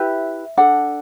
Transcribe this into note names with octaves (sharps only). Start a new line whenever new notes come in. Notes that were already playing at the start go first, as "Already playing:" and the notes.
Already playing: E4 G4 B4 E5
D4 A4 F#5